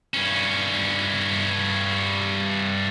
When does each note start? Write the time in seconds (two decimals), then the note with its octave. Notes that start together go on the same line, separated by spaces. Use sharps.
0.14 G2 C#4